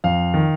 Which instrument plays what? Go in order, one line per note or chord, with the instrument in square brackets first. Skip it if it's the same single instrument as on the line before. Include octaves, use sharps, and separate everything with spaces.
[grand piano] F2 F5
D#3